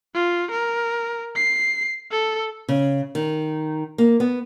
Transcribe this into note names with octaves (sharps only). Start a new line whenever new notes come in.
F4
A#4
C7
A4
C#3
D#3
A#3
B3